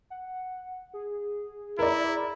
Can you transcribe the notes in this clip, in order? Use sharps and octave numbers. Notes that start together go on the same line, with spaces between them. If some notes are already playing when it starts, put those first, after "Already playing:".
F#5
G#4
E4 A#4 D5